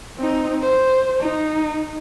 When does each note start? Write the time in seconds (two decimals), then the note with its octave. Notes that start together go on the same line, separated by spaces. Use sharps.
0.18 C4 D#4
0.62 C5
1.20 D#4